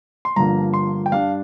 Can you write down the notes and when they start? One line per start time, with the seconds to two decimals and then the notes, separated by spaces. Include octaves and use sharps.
0.25 C6
0.36 G1 G2 D3 F3 A#3 A#5
0.74 C6
1.06 G5
1.11 G2 G3 D4 F5